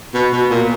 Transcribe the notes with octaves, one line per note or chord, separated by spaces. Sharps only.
B2
B2
A#2